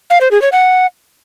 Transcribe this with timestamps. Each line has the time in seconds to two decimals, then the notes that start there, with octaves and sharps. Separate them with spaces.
0.10 F5
0.21 C5
0.31 G#4
0.42 C#5
0.52 F#5